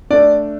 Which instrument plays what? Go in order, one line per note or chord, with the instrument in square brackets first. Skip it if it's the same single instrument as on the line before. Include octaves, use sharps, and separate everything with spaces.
[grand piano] A3 D4 D5